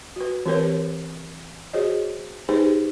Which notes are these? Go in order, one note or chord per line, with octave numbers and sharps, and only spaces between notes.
F#4 B4
E3 C4 G4 A#4 B4 C#5
F#4 G#4 C5 C#5 D#5
D#4 G4 G#4 B4 C5